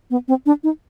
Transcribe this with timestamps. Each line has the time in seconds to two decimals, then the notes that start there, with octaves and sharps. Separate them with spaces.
0.10 B3
0.28 C4
0.46 D4
0.63 D#4